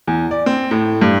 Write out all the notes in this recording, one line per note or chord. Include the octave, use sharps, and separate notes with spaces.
E2
D5
C4
A2
G2